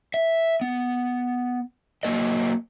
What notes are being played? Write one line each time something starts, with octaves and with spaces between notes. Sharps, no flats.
E5
B3
F#3 A#3 A#4 D#5